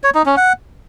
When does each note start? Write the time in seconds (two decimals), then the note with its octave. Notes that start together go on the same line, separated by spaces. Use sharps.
0.04 C#5
0.15 D#4
0.26 C#4
0.37 F#5